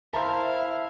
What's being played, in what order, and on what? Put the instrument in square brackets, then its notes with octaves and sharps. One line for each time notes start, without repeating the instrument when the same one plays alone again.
[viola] E4 F5 [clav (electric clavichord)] A#4 C5 [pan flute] E5 [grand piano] A5